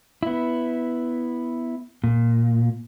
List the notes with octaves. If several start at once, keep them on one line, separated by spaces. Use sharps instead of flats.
B3 E4
A#2